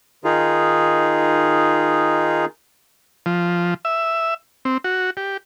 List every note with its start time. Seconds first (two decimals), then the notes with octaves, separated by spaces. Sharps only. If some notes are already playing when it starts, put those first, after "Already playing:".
0.24 D#3 D#4 F4 G#4
3.26 F3
3.85 E5
4.65 C4
4.84 F#4
5.17 G4